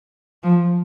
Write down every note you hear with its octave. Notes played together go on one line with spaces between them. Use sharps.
F3